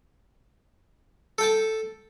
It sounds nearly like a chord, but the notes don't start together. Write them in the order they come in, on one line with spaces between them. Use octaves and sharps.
A4 G5 A5